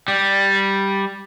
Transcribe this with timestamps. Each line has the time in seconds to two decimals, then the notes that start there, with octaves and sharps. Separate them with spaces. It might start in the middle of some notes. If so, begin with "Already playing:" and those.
0.08 G3